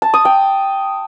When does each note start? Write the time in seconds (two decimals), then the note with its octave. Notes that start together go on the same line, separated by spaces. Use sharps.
0.02 A5
0.14 D#6
0.25 G5